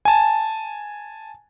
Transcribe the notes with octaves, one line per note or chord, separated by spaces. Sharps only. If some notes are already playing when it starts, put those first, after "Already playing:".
G#5 A5